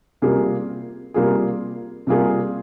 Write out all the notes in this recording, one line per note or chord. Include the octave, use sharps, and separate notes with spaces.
C3 G3 A#3 F4 G#4
C3 G3 A#3 F4 G#4
C3 G3 A#3 F4 G#4